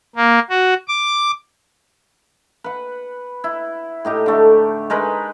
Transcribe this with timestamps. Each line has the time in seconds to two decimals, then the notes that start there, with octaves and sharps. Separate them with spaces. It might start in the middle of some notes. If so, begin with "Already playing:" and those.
0.16 A#3
0.50 F#4
0.88 D6
2.64 B4 F#5
3.44 E4
4.05 A2 D#4 G4
4.26 D3 A3
4.90 G#3 D#4 A#4 B4